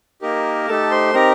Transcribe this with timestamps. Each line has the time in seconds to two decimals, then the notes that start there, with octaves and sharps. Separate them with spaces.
0.22 A#3 D#4 G4 A#4
0.68 A3 D#4 G4 A4 A5
0.91 C5 C6
1.14 C4 D#4 G4 A#4 A#5